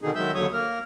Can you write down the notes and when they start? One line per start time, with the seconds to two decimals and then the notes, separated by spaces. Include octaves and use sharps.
0.02 B2 D3 D#3 D#4 G#4
0.15 D#3 F#3 G#3 E5 E6 G6
0.35 D#2 D3 F#3 C#5 C#6 D#6
0.53 A#3 A#4 F6